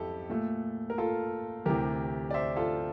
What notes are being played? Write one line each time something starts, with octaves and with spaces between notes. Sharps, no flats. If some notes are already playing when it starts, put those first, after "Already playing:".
Already playing: F2 E4 G4 A4
A#2 A3
A#4
F4 A4
D2 C3 E3 G4 A#4
D5
C5 E5
F4 A4